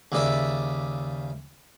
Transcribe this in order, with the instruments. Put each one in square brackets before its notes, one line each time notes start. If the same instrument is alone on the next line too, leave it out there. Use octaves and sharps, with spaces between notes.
[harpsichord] D#2 C#3 D5 E5